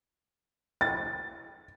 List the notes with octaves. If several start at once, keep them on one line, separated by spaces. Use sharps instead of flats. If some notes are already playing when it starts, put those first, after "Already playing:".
A6